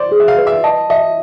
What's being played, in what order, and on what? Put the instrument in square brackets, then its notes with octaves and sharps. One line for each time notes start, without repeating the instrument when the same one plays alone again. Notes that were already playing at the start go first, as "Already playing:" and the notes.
Already playing: [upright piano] C5 D5
[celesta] G#4
[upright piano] E5
F5
[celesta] B4
[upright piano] E5
[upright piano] D#5 [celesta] A5
[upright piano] D#5 [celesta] E5